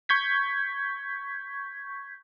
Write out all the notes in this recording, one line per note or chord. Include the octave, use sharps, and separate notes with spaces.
C#6 G6 G#6 B6